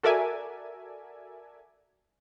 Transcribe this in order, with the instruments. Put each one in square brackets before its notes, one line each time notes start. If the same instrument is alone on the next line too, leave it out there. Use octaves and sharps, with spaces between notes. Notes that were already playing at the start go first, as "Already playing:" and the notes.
[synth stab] F#4 A4 A#4 D5 E5 G#5